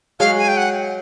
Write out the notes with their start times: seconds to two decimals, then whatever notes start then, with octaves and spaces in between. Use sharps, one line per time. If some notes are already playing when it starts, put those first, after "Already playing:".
0.20 F#3 G#3 F5
0.38 G#5
0.48 G5
0.57 F#5